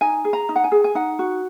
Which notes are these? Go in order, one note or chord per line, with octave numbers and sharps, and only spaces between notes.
D#4 G#5
G#4
A#5
D#4
F#5
G#5
G#4
G#5
D#4 F#5
F#4